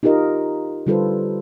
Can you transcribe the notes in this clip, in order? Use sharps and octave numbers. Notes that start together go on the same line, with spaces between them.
D#4 F4 G4 A#4 D#5
D3 G3 F4 A4 B4 C5